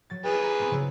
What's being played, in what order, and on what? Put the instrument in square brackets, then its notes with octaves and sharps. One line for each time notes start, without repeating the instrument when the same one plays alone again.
[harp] F#3 A6
[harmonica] G#4 B4 [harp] D#5
[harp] A#5
B3 C4
C#3 F#3 E4